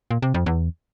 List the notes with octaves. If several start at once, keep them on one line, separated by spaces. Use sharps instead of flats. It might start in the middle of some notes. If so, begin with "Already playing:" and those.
A#2
C3
F2
E2